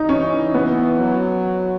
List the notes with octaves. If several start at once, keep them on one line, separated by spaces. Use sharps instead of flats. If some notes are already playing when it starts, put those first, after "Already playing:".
Already playing: D#4
E3 C#4
B3
F#3